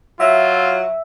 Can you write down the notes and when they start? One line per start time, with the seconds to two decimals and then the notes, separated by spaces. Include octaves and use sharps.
0.20 F#3 F4 E5